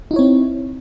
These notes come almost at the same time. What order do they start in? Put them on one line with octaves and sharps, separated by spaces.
D#4 E4 C#5 C4